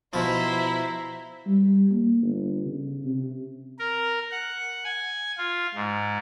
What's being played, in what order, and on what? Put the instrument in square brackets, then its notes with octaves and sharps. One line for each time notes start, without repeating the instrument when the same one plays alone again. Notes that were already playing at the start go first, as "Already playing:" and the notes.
[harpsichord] B2 F3 [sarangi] E4 [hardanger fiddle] C5 A#5
[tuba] G3
A#3
G1
C#3
C3
[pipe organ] A#4
F#5
G#5
F4
G#2